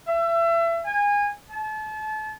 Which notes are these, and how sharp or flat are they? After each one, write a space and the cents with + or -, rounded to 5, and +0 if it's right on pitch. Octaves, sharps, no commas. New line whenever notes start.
E5 +30
G#5 -25
A5 -35